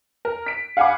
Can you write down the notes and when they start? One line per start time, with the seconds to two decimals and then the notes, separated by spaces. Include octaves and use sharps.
0.25 A#4
0.46 B6 D7
0.77 F5 F#5 G#5 B5 D6